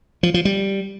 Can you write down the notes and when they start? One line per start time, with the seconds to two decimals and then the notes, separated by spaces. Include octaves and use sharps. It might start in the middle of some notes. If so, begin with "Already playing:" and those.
0.23 F3
0.34 F3
0.45 G3